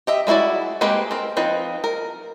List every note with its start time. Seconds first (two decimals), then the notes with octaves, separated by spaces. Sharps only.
0.07 G4 D#5 E5
0.27 G#3 A#3 E4 F#4 D5
0.81 G#3 A#3 C4 G4 B4
1.11 C4 A#4
1.37 F3 C4 D#4 B4
1.84 A#4